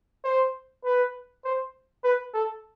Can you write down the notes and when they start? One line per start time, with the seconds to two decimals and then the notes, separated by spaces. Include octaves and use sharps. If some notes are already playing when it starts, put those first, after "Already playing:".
0.25 C5
0.85 B4
1.44 C5
2.04 B4
2.34 A4